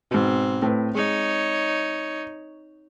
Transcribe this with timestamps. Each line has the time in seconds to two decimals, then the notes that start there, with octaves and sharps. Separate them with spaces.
0.11 G#2 B2 C4
0.62 A2 B4
0.95 G#3 D#4 C#5